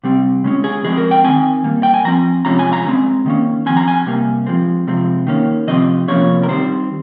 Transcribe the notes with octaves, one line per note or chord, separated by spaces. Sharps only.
C3 G3 C4
C#3 G#3 C#4
G#4
F3 G#3 C4 G#4
A#4
G5
D#3 G#3 C4 G#5
A#2 G3 A#3
G5
G#5
F3 C4 A#5
C3 F3 G#3 C#4 A#5
G#5
A#5
C#3 G#3 C4
D#3 A#3 C#4
F3 C4 G#5
A#5
G#5
C3 G3 A#3
F3 G#3 C4
C3 F3 G#3 C4
D#3 A#3 C#4
C3 F3 C4 D#5
C3 F3 A#3 C#4 C#5
A#4
D#3 G3 C4 C5